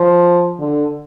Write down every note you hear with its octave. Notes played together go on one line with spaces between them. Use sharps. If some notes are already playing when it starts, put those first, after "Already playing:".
Already playing: F3
D3